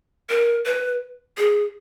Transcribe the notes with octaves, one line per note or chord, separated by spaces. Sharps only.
A#4
B4
G#4